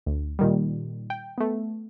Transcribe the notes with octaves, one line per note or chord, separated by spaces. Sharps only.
D2
A#2 D#3 G3
G5
A3 B3